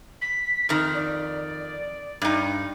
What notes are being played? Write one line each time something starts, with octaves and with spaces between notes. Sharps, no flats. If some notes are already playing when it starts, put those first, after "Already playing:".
B6
F2 D#3 F6
D5
G2 D#4